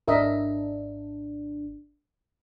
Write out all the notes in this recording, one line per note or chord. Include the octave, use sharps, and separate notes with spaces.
G#1 D4 A#4 D#5 E5